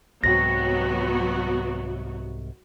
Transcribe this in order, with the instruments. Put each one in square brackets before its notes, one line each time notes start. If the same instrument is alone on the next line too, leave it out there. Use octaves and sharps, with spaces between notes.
[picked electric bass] C2 G#2 C3 [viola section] F#3 B3 F#4 [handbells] A#6